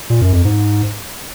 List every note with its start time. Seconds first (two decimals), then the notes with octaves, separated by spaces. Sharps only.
0.10 A#2
0.21 F#2
0.33 F2
0.45 G#2